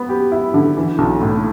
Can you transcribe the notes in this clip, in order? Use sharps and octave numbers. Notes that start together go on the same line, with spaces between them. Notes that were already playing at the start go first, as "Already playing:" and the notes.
Already playing: B3
G4
E4
D3
E3
B1
A2